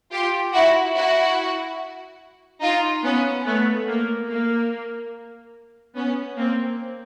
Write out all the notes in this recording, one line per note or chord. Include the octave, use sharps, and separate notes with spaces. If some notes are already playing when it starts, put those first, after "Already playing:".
F4 G4
E4 F#4
E4 F#4
D#4 F4
B3 C#4
A3 B3
A#3
A#3
B3 C#4
A#3 C4